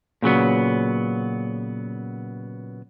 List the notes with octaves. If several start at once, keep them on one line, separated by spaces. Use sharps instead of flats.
A#2 C#3 F#3 B3